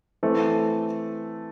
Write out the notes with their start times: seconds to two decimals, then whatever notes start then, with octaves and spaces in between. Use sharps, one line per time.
0.23 E3 A3 C4